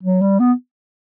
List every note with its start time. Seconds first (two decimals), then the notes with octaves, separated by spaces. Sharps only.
0.03 F#3
0.21 G3
0.39 B3